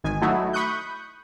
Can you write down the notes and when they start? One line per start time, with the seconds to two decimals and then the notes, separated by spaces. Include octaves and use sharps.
0.04 G#1 D#3 G#5
0.22 F#3 A3 D#4 E4 F#4
0.53 B5 C#6 D#6 F#6 G6